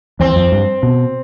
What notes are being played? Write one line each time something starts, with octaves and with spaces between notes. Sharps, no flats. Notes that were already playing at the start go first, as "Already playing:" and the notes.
E2 C4
F2
G2
B2